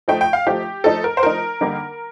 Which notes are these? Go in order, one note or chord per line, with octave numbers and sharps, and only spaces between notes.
F3 A3 D#4 G5
G5
F5
F3 A3 D#4 G4
F3 A3 D#4 A4
A#4
C5
F3 A3 D#4 A#4
D3 G3 A#3 D#4